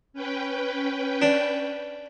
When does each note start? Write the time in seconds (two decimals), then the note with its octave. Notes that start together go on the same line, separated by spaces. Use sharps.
0.13 C#4 B4 G5
1.22 D4